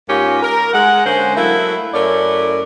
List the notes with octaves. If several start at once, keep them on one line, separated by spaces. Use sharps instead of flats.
G#2 G#3 A#3 C#4 F4 G4
A#4
G#3 F#5
D3 G#3 A#3 C#4 A#4 C5
F#3 A3 A#3 E4
F#2 A3 C#4 E4 A#4 D5